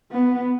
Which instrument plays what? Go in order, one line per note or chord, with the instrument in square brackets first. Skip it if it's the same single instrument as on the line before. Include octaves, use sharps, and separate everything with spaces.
[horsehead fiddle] B3